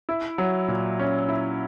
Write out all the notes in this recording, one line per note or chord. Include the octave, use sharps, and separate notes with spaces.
E4
F#3
A#2
C#4
E4